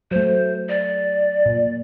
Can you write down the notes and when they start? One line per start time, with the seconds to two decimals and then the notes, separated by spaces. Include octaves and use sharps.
0.11 F#3 A3 C5
0.69 D5
1.46 A#2